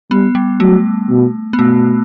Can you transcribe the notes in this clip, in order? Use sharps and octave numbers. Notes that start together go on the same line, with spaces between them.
G3 B3
G3
F#3 A3
B2
B3
B2 A3